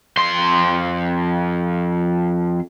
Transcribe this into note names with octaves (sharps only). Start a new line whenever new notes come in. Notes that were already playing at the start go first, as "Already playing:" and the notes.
F2 C6